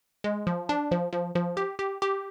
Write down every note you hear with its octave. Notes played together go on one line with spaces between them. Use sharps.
G#3
F3
D4
F3
F3
F3
G4
G4
G4